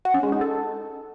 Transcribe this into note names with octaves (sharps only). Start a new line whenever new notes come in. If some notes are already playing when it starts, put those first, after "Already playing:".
F#4
C#4
G#3
D#4
A4